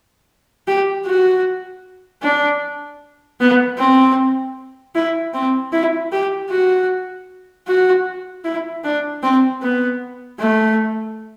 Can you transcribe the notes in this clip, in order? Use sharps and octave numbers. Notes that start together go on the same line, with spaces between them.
G4
F#4
D4
B3
C4
E4
C4
E4
G4
F#4
F#4
E4
D4
C4
B3
A3